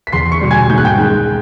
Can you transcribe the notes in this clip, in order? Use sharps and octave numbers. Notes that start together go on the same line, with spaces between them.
B6
E2 C6 C7
C#6 C#7
B2 G3
G#5 G#6
G#2 G6
F#6
G5 G6
D#3 G#3